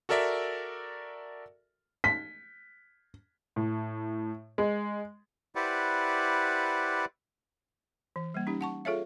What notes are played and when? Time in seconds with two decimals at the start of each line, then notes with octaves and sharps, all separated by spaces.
0.09 F#4 A4 A#4 D5 E5
2.04 B6
3.56 A2
4.58 G#3
5.55 E4 G4 B4 C5 D5 F#5
8.16 E3
8.34 G3 A#3
8.47 C#4 D#4 G4
8.61 F#5 A5 C#6
8.85 F4 G#4 A4 C#5 E5 F5